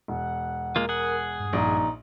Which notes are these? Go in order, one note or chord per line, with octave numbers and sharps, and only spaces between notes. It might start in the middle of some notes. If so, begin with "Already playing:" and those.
E1 F#5
G#3 A#3 F4 A#4
G#4 F#5
G2
A#1 D#4